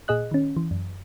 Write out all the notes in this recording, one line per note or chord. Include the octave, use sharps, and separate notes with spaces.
A#2 G#4 D#5 F#6
D#3 C#4
E3
F#2